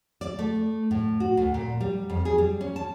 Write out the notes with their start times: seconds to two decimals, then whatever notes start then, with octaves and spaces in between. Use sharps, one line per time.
0.21 D5
0.39 A3
0.91 A2
1.20 F#4
1.37 D2
1.54 A#2
1.81 G3
2.10 F2
2.25 G#4
2.38 G3
2.61 C#4
2.76 A5